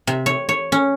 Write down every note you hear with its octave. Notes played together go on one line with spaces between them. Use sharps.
C3
C#5
C#5
C#4